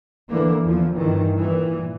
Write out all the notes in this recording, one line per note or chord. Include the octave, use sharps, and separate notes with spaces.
D3 E3 A#3
E2 F3
G2 D#3 E3
A#2 E3